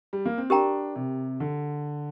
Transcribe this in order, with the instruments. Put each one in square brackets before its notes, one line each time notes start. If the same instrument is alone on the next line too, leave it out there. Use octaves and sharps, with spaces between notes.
[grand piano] G3
A#3
C4
[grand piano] D4 [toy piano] G4 A#4 G5 A#5
[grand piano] C3
D3